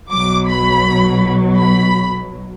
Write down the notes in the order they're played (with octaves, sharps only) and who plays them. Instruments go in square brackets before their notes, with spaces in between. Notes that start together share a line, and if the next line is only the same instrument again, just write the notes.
[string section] B1 B2 F#3 D6
B5
B5